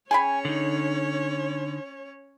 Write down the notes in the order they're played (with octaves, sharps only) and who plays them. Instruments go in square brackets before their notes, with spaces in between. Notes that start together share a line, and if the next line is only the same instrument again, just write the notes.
[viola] C#4 C#5 [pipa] G#4 G5 B5 [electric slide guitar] G#5
[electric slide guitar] D3 D#4